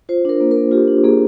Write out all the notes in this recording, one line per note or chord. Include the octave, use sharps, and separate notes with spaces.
F4 C5
D4 A#4
A#3
A#4
A#3
F4 G4
D4
A#3 G#4